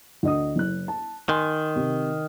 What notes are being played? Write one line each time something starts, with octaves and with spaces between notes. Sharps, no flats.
D2 D#5 D#6
F#1 F#6
A5
D#3 G#5 C6 F#6
C3